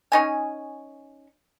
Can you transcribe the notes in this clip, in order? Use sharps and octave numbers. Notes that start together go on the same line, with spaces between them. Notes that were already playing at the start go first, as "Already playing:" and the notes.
C#4 D#4 G#5